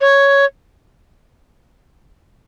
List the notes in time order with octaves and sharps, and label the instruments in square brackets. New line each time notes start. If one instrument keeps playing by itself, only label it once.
[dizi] C#5